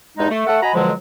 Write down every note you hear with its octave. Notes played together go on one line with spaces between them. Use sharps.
E2 G2 G#3 D#4
A3
A3 A4 F#5
F#4 D#5 G#5 A#5 B5
F2 B2 D3 F3 F#3 G#3